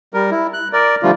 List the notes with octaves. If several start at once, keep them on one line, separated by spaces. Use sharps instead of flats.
G3 A#4
E4
F#6
A#4 D5
D3 F3 G3 A3 F4